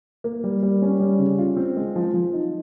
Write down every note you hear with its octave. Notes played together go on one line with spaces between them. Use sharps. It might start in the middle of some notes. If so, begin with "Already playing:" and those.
A#3
G3
G3
C#4
G3
C#3
F4
C4
G#3
F3
F3
D#4